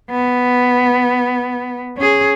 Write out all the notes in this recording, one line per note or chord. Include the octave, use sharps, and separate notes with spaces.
B3
C#4 G#4